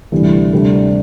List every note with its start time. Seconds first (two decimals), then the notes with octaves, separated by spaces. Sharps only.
0.12 D2 C3 E3 G3
0.53 D2 C3 G3 D4 G4